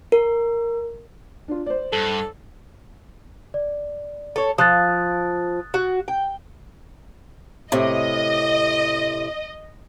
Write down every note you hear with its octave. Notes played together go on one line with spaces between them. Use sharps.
A#4
D4 F4
C5 D5
G2 A4
D5
A4 C#5
F3 D#6 F#6 A6
F#4
G5
A2 C3 D#5